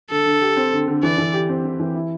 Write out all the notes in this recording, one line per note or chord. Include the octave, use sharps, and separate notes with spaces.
D3 A4
D3
G4
C4
D3
D3
E3 D5
E3
G4
C4
E3
E3
E4